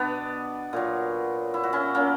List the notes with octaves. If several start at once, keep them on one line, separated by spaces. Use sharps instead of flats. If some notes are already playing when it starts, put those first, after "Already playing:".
Already playing: B2 B3 D4
A#2 F#3
E4
F#4
C#4 E4
A#3 C#4